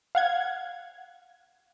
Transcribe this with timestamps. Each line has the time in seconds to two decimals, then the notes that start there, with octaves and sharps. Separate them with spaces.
0.15 F5 F#5 G#6